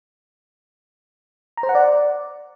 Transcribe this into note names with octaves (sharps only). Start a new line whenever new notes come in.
A#5
C5
F#5
D5